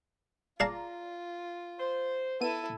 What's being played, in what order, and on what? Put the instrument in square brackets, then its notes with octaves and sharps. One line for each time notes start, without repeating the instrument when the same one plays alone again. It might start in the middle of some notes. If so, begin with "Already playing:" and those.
[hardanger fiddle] F4 [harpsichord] G#4 F5 A5 [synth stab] D5 A#5
[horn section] C5
[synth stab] B3 D#7 [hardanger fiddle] E4 A4